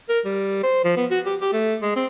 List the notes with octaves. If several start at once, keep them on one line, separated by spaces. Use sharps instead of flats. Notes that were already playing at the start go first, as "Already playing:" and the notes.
A#4
G3
C5
F3
B3
F#4
G4
G4
A3
G#3
C4